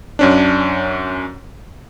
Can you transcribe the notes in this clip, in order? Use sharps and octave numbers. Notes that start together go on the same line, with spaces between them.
F#2 C#4 D4